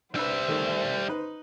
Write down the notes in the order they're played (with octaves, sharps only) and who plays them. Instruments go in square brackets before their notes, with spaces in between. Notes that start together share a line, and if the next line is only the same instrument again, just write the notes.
[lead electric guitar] G3 E5 [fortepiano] D4 B4 [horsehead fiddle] C5
[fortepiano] D#3 A3
D#4 B4